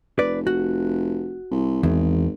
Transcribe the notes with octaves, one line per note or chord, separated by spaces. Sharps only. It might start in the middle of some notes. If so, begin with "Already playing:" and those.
F1 B4 D5
F#4
C2
G#1 E2